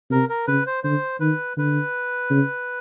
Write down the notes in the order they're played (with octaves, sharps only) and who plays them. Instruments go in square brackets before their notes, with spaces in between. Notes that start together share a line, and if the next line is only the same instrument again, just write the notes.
[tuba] C3 [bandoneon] A#4
[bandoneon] A#4
[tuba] C#3 [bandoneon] B4
[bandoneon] C5
[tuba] D3 [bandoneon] C5
[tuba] D#3 [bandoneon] B4
[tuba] D3 [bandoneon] B4
[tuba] C#3